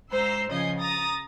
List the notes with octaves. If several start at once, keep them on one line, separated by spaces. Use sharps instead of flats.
G#2 C5 A#5 E6 C7
C#3 F3 D#5 G#5 G6 C7
A#5 D#6 A6 A#6